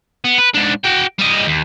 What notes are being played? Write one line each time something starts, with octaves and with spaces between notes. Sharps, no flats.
B3
B4
G#2 D4
F#4 G5
G3 D#5
D#2